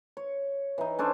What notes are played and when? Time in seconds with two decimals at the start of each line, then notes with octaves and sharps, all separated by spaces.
0.17 C#5
0.78 E3 D#4
0.99 C#4 D4 A4 C5